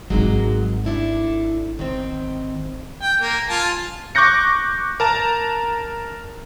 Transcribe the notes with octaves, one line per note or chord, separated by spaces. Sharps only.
G#1 F#3 G#3 A#3 D#4
D4 E4 A4
D#3 C4
G5
A#3
F4 G#5 A5
C#6 D6 F#6 G6 A#6 C#7
A#4 A5 A#5